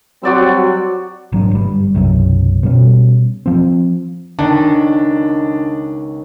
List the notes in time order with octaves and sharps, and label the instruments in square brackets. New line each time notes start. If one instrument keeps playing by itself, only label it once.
[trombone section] F#3 G3 C4 [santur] F#4 D5 E6
[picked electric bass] G#1 F#3 D4
G1 G3
B1 F#2 C3 F#3
B2 G3 C#4
F3 C4
[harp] C#2 [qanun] D#3 [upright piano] D4